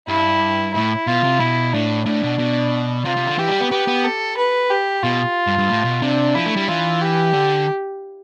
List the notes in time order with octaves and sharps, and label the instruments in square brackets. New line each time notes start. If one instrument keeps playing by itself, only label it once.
[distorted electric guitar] G2 [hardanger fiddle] E4
[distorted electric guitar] A2 [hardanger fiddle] E4
[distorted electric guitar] B2 [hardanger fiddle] F4
[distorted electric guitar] C3
[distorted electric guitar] B2 [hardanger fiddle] E4
[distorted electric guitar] A2 [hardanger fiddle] D4
[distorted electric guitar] A2 [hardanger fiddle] D4
[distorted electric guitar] B2
B2
[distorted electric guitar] C3 [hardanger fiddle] F4
[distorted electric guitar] C3
D3
[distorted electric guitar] E3 [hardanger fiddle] G4
[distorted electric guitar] G3
B3
[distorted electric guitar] B3 [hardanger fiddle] G4
[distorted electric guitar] B3
[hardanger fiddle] A4
B4
G4
[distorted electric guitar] B2 [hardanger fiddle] F4
[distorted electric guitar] G2
G2
A2
B2
[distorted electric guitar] C3 [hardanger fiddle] D4
[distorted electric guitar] F3 [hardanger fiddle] E4
[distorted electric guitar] A3
G3
[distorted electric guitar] E3 [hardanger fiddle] F4
[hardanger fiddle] G4
[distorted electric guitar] D3